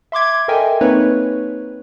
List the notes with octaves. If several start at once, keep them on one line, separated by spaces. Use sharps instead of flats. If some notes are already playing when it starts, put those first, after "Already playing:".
E5 C6 D6 G#6
A4 A#4 D#5 E5 G5 G#5
A#3 C4 D#4 B4 C#5